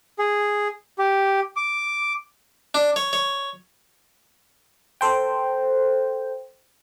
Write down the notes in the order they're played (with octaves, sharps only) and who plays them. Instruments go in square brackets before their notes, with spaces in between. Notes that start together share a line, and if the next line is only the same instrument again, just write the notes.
[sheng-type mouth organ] G#4
G4
D6
[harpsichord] D4
C#5
C#5
[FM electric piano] A4 C5 G5